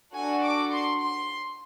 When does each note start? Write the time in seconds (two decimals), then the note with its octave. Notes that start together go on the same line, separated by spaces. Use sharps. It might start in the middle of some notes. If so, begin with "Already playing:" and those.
0.14 D4 F#4 A4 G#5
0.43 D6
0.71 C6
1.01 C6